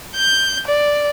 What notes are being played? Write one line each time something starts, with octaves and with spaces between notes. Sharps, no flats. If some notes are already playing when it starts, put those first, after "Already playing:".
G6
D5